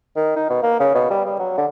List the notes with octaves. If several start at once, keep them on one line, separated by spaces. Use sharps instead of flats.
D#3
D#4
B2
A#3
C#3
B2
G3
G3
F#3
D3